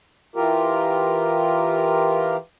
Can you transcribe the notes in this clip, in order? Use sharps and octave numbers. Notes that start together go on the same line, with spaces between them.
E3 F4 G4 A#4